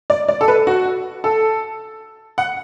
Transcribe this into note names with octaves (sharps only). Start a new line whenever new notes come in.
D5
D5
A4
B4
F#4
A4
F#5